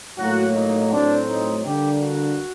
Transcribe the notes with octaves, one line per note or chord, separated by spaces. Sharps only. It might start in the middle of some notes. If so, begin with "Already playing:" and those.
A2 F#3 A#3 F#4
D#4
A2 F#3 C4 D4
D#4
D3 G3 A#3 D4 G4
F#4